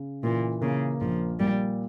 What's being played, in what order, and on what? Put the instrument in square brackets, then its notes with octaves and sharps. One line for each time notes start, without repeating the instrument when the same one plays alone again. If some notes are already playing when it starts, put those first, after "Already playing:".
Already playing: [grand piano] C#3
[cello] A#2 [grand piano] E3
[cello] C#3 [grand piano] A#3
[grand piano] A#1 [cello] F3
[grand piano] A#2 [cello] G3